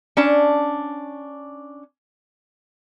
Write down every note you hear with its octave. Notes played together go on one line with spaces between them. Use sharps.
C#4 D4 A5